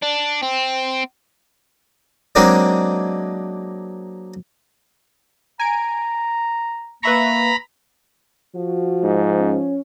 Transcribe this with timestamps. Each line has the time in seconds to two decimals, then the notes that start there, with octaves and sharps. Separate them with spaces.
0.03 D4
0.43 C4
2.35 F#3 G#3 A#3 C4 D4 D#4
5.60 G#5 A#5 D7
7.03 A#3 B4 E5 A#5 B5 C#6
8.56 F3 F#4
9.03 G#2
9.39 C#4